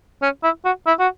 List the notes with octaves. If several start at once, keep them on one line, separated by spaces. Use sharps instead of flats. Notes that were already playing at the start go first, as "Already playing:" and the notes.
C#4
E4
F#4
E4
F#4